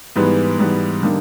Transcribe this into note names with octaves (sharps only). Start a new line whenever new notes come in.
G#2 E3 G3 B3
G#2 E3 G3 B3
D3 G3 A#3 D#4 G4